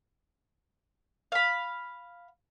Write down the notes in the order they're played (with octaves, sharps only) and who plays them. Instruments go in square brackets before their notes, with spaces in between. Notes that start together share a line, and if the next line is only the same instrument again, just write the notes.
[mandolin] F5 B5